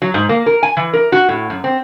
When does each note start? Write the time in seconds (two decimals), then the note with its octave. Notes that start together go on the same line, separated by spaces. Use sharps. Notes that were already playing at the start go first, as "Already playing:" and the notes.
0.02 F#3
0.14 G#2
0.29 A#3
0.46 A#4
0.63 G#5
0.77 E3
0.93 A#4
1.12 F#4
1.29 A2
1.50 F#2
1.64 C4